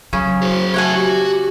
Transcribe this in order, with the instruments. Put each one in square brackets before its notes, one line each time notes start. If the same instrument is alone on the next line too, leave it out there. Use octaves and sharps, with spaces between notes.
[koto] C#3 C#4 [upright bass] F#3
[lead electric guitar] F#4 G#4 [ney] C5
[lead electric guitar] G4 A5 [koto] C#5 F#5 G#5 [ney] E5
[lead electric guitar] F#4 [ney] G4